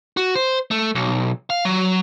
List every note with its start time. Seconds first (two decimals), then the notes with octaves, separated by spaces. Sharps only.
0.17 F#4
0.35 C5
0.71 A3
0.95 B1
1.50 F5
1.65 F#3